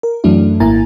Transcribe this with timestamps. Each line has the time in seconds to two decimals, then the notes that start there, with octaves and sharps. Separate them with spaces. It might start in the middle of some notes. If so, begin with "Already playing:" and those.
0.03 A#4
0.24 F#2 E3 F#3 A3 D4 E4
0.60 G#1 A#3 E4 G#5 A#5 A6